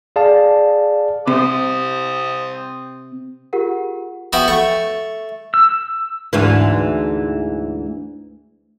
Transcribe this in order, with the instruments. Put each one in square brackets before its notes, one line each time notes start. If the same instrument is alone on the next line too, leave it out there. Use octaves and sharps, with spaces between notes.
[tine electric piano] G#4 D5 F5 A5
[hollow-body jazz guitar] C3 [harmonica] C4 C5 D#6
[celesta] F4 G4 G#4 A#4 F#5
[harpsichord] B3 F#4 E5 G5
A3 C#6
[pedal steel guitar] E6
[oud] D2 G#2 E3